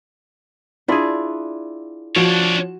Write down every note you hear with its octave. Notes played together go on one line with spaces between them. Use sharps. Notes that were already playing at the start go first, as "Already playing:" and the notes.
D4 E4 F4 G#4 D5
F3 D4 F#4 C#5 E7